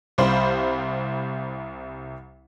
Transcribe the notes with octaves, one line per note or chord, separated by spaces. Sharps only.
C2 G3 C5 F5 B5